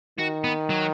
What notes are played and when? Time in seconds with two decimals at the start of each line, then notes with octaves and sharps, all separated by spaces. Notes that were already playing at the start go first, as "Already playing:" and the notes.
0.19 D#3 F#4
0.44 B3
0.70 F#3